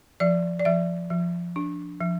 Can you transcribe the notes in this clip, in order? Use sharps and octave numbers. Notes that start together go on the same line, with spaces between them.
F3 D5
D5
F3 E5
F3
D4
F3